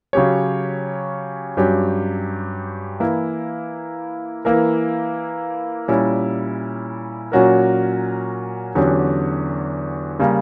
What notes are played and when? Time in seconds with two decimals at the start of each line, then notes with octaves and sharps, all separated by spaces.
0.13 C#3 F#3 C#4 G4 C#5
1.57 G2 F#3 C#4 G4
3.00 E3 A#3 E4
4.45 E3 A#3 E4 A#4
5.88 A#2 G3 C#4 E4
7.32 A#2 F#3 C#4 F#4 A#4
8.75 E2 D3 F#3 C#4 G4
10.19 C#3 G3 A#3